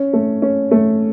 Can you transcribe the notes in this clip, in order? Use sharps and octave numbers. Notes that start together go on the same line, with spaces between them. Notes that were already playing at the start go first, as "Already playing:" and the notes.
Already playing: C#4
A3
C#4
A3